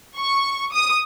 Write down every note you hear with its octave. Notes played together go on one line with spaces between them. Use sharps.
C#6
D#6